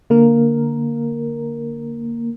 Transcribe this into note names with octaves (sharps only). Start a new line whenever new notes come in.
D3 A#3 A#4